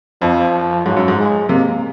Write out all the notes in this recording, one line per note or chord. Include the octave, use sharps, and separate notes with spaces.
F2 F3
G#2 F#3
F#2
G#2
G#3
C3 A#3